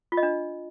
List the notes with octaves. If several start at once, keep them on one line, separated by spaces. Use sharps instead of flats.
F4
D#5
D4